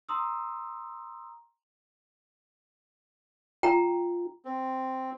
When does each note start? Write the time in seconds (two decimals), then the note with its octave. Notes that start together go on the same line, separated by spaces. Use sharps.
0.09 A#5 C6 D#6 E6
3.63 F4 G5 A#5
4.45 C4